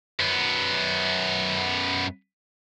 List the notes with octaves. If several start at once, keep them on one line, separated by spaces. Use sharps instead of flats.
F#2 B3